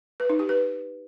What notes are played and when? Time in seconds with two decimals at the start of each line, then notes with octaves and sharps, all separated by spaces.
0.20 B4
0.30 D#4
0.39 G4
0.49 B4